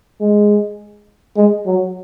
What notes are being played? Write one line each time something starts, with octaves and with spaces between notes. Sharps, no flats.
G#3
G#3
F#3